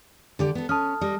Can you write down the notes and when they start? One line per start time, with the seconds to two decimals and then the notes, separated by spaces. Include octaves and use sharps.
0.39 D3 G4 D5
0.55 B3 A4
0.69 C#4 A5 D#6 F6
1.01 G3 D#5